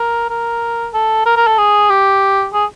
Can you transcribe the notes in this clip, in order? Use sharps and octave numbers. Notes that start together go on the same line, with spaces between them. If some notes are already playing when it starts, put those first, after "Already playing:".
Already playing: A#4
A#4
A4
A#4
A#4
A4
G#4
G4
G#4